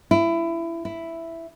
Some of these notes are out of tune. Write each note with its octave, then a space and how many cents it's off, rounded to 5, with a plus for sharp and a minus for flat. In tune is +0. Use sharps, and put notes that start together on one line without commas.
E4 +20
E4 +5